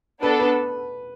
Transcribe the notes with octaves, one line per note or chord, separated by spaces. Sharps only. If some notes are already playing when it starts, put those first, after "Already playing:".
B3 D4 A4 B4
B4